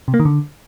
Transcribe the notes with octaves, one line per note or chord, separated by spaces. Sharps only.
C3
A#3
D#3
D3